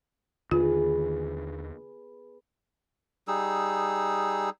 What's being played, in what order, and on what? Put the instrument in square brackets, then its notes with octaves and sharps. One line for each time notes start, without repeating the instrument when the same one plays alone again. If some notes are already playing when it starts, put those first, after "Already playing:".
[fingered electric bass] D#2 D3 D#3 [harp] B3 G#4 [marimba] F4
[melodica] G3 D#4 G#4 E6